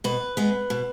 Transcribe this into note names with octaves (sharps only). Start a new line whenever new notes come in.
B2 B4
G#3 B3
B2